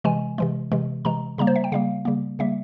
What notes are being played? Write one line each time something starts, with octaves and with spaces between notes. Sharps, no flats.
C3 E3 G#3 G#5
C3 E3 G#3
C3 E3 G#3
C3 E3 G#3 A#5
C#3 G3 A#3 A#5
C5
E5
G5
C#3 G3 A#3 F5
C#3 G3 A#3
C#3 G3 A#3 E5